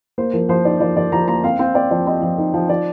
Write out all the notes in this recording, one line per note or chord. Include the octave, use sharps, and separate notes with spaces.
A#3 C5
F3 A#4
F3 C5
D#4 D5
F3 D5
F3 D5
F3 A#5
A#3 A#5
C4 F5
C4 F5
C4 D5
F3 D5
C4 D#5
F3
D#4
F3
F3 D5